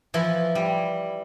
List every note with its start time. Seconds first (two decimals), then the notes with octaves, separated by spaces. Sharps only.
0.14 E3 F3 E4
0.55 G3